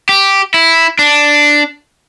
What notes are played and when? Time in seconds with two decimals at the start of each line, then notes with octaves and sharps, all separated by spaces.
0.09 G4
0.54 E4
0.99 D4